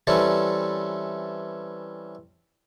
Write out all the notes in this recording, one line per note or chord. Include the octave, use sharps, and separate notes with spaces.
E3 G3 C4 C#4 A4